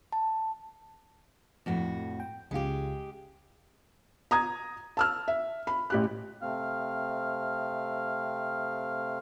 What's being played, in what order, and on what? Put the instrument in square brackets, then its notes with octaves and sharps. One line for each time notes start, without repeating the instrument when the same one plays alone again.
[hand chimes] A5
[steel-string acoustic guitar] F2 A2 F#4
[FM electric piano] G5
[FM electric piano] C#2 C#3 F4 [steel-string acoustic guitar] G#3 G4
[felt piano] A#5 D#6 G#6
A5 E6 F6
E5
B5
A1 G4 F#6
[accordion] C3 A3 C4 F5 F6